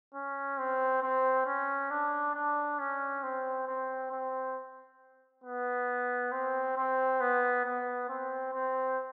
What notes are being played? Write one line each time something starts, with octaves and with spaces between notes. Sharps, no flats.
C#4
C4
C4
C#4
D4
D4
C#4
C4
C4
C4
B3
C4
C4
B3
B3
C4
C4